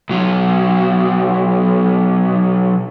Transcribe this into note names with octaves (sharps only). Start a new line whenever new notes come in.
B1 F#3